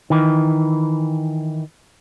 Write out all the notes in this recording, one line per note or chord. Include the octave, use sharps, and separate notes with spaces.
D#3 E3